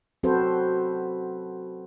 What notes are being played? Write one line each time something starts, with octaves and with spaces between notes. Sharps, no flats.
F#3 C4 F#4 A4 B4 C5